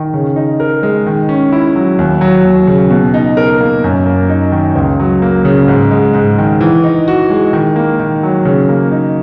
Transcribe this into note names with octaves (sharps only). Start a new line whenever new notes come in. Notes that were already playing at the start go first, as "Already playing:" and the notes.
Already playing: D#3
C#3
D#4
A#4
G#3
D#3
C#4
E4
F#3
D#2
F#3
D#2
C#3
B2
D#4
A#4
A#3
F#2
A#3
D#4
D#3
C#2
F#3
A#3
C#3
G#2
G#3
G#2
D#3
E3
D#4
F#4
G#3
D#3
A#3
D#3
F#3
C#3
A#3
D#4